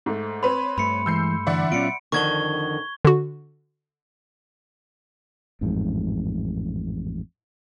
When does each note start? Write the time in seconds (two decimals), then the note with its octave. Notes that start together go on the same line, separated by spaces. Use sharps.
0.06 G#2 A3
0.43 C4 B4 C#5 B5 C6
0.78 G2 A3 B5 C#7
1.06 E3 G#3 E6 G6 C7
1.47 D3 E3 D5 E5 F#5
1.72 A#2 F#3 B3 C#4 F4 C#7 D7
2.12 F2 D3 D#3 C#6 G#6 G7
3.05 D3 F#4
5.61 A1 F2 G#2